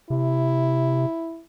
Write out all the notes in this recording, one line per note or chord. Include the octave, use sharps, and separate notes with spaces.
C3 E4